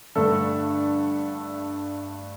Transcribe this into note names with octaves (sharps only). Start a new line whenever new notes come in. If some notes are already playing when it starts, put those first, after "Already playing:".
G2 D3 A3 A4